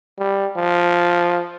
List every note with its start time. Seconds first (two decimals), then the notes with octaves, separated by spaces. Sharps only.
0.19 G3
0.57 F3